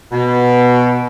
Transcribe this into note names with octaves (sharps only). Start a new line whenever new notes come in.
B2